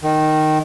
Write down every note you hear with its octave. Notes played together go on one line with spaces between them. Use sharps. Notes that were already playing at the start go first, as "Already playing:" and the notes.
D#3